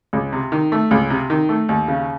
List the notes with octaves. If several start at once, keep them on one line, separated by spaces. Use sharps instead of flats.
C#2
C3
D#3
A3
C#2
C3
D#3
A3
D#2
C#3